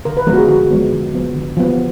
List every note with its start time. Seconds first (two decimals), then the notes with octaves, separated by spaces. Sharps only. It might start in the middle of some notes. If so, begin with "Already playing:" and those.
0.05 D3 A#4
0.17 B4
0.27 F3 G#3 B3 A#4
0.33 F#4
0.38 G#4
0.48 D3 F#4
0.71 F3 G#3 B3
0.92 D3
1.14 F3 B3
1.35 D3
1.57 F3 B3